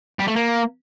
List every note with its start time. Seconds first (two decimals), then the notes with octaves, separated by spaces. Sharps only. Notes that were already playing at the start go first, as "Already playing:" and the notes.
0.20 G3
0.28 A3
0.36 A#3